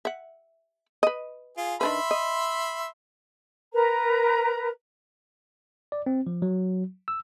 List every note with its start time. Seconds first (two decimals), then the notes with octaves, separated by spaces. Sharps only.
0.05 E5 F#5
1.03 B4 D#5
1.57 F4 G#4
1.81 D#3 D4 B4 E5 B5 C6
2.11 D#5
3.73 A#4 B4 A#5
5.92 D5
6.06 C4
6.27 F3
6.42 F#3
7.08 E6